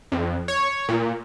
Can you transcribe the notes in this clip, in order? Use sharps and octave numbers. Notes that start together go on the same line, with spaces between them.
F2
C#5
A#2